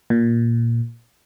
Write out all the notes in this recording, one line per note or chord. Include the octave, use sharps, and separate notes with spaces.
A#2